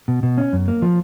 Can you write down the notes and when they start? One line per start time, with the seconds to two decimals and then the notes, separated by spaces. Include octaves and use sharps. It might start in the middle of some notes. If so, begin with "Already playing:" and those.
0.08 B2
0.23 B2
0.38 C#4
0.53 F#2
0.68 A#3
0.82 F3